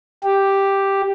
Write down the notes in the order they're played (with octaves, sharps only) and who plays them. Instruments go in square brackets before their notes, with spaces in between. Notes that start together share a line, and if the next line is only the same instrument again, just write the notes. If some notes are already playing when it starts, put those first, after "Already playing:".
[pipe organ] G4